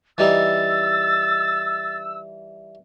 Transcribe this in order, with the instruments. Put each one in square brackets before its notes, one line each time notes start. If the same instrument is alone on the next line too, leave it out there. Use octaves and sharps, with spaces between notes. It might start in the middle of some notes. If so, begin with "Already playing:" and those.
[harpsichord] E3 G3 D#4 [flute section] E6 [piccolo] A6